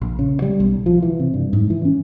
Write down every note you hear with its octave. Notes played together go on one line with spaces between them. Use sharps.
A#1
C#3
G3
B1
F3
E3
C3
G2
G#2
E3
C#4